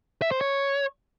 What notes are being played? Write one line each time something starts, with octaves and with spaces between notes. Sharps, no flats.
E5
C5
C#5